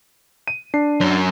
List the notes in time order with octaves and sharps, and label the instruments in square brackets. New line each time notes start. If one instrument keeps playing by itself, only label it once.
[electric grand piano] D#7
D4 C7
[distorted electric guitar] F#2